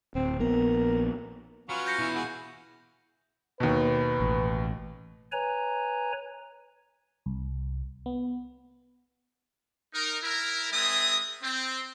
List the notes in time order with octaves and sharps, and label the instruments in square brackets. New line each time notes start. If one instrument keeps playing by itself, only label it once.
[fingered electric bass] D1 [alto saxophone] C4
[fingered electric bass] A#1 B3 [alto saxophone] A#4
[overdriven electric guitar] F#3 [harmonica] C#4 F4 B4
[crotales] G6 A#6 C#7
[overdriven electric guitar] B2 E3 [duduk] E4
[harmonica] F#4 G#4 B4
[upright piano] D#2 B2 [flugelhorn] B4
[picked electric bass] A1
[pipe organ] B4 C#5 G#5 A#5
[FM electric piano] C2
B3
[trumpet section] D#4 A#4
E4 A#4
G#3 C4 G#4 A#4 E5 D#6
C4